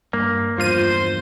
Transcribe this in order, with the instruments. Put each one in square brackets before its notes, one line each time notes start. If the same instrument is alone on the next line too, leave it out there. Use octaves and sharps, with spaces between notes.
[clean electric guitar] G2 [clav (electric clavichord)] A#3
[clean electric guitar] E2 G2 [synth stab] F3 F4 D#7 [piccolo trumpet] C5